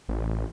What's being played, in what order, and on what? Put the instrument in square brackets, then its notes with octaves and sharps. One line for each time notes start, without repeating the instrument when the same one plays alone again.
[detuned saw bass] A1